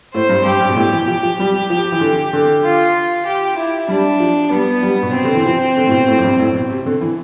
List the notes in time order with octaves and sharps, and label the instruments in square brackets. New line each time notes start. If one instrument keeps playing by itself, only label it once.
[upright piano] A2 [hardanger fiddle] C5
[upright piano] G2
[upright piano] G2 [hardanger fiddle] G4
[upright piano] G2
B2
[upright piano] A2 [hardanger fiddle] G4
[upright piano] E3
F3
F3
G3
F3
E3
D3
D3
[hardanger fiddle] F4
G4
E4
[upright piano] G3 [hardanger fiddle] D4
[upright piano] F3
[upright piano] G3 [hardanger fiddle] B3
[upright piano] G3
B2
[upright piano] C3 [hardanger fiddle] C4
[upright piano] D3
E3
F3
D3
A2
B2
A2
F2
G2
A2
B2
C3
D3
E3